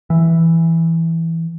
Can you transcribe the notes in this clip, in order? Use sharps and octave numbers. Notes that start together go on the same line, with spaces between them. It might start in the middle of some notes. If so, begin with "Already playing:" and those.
E3